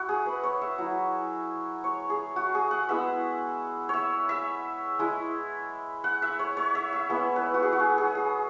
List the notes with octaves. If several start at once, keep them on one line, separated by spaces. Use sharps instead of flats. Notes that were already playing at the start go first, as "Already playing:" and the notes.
Already playing: E4 F#4
G#4
B4
C#5
E5
F#3 E4
C#5
G#4
F#4
G#4
F#5
G#3 B3 E4 E5
C#5 E5
E5
G#3 E4
F#5
E5
C#5
C#5
E5
E5
G#3 B3 E4 C#5
B4
F#4
G#4
F#4
G#4
G#4
G#4